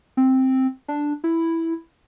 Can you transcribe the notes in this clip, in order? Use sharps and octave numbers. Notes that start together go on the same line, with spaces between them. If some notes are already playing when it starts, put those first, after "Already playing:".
C4
D4
E4